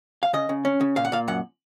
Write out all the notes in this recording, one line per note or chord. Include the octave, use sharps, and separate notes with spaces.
F5
C#3 D#5
C#3
C#4
C#3
A#2 F5
F#5
A#2 F5
F#2 F#5